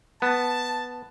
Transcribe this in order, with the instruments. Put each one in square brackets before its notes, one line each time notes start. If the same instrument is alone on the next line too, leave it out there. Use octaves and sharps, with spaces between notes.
[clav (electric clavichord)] B3 [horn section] A5